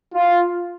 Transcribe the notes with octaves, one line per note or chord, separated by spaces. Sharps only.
F4